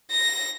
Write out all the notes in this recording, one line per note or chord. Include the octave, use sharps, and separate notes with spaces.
A#6